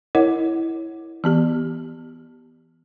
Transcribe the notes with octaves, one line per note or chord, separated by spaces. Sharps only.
E4 A#4 C#5 D#5 F#5
E3 B3 G4